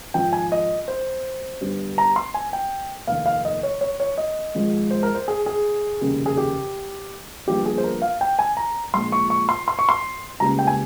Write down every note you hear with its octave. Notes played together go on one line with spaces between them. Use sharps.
G#1 G#2 F3 G5
G#5
D#5
C5
G1 G2 G3
A#5
C6
G#5
G5
F1 D#2 D#3 F5
F5
D#5
C#5
C#5
C#5
D#5
G#1 G#2 F3 G#3
C5
A#4
C5
G#4
G#4
F1 D#2 C#3 G3
G#4
G4
G1 G2 F3 A#3 G4
G#4
C5
A#4
F5
G5
G#5
A#5
A#1 A#2 G#3 C6
C#6
C#6
C6
C6
C#6
C6
C#2 C#3 G3 A#3 A#5
G5
G#5